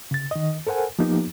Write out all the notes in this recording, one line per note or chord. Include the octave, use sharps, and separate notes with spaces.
C#3 A6
D#3 D#5
A4 A#4 C5 F#5 G#5
F3 A#3 B3 D#4 G4